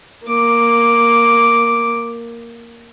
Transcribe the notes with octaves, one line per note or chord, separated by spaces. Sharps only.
A#3 D6